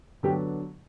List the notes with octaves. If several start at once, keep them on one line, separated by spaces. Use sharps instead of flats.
D3 F#3 B3 D4 G4